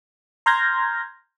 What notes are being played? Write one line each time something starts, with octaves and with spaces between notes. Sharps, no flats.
A#5 C6 F6 G6 G#6 A#6